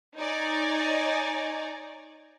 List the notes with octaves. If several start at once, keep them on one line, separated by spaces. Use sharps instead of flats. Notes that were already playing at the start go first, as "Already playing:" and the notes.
D#4 C#5 D5 G#5 A#5